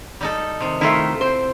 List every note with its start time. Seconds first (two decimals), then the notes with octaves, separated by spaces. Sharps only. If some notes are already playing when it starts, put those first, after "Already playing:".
0.21 G3 D#4 A4
0.60 C3 D#3
0.81 D#3 A3 E4 F4
1.21 C4 C5